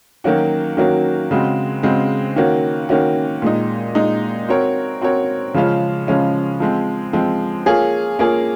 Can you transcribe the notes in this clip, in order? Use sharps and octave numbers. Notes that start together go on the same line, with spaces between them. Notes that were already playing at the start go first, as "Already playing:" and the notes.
D#3 F#3 A#3 C#4 F#4
D#3 F#3 A#3 C#4 F#4
C#3 G#3 C4 F#4
C#3 G#3 C4 F#4
D#3 A#3 C#4 F#4
D#3 A#3 C#4 F#4
A#2 G#3 D#4
A#2 G#3 D#4
C4 F#4 A#4 C#5
C4 F#4 A#4 C#5
C#3 F3 G#3 C#4 F4
C#3 F3 G#3 C#4 F4
F3 G#3 C4
F3 G#3 C4
A#3 F4 G#4 C#5
A#3 F4 G#4 C#5